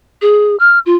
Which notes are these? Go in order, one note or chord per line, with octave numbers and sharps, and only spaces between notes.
G#4
F6
F4